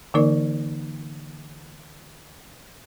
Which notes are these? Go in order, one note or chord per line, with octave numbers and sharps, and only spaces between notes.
D3 E3 A#3 D#4 A#4 D5